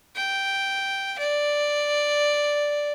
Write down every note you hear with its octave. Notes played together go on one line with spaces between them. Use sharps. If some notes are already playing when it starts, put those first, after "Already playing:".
G5
D5